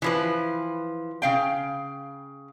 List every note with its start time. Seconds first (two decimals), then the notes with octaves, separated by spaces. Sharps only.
0.02 E3 F3 B4
1.22 C#3 F5 G5